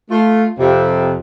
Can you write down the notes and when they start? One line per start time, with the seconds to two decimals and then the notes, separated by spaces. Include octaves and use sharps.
0.10 A3 F4
0.59 F2 C3